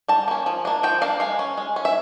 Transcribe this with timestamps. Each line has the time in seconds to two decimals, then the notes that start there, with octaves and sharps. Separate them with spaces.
0.08 G3 A5
0.28 A#3 C#4
0.46 F3
0.65 A#3 D4
0.83 F3 G5
1.01 A#3 D4 F5
1.20 G#3 F5
1.39 C#4
1.57 G#3
1.76 C#4
1.85 E5